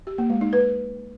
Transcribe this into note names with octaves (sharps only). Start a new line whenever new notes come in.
G4
A#3
G#3
D#4
B4